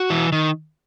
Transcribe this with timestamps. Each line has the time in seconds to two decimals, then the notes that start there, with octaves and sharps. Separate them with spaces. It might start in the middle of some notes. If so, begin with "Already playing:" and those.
Already playing: F#4
0.10 E3
0.32 D#3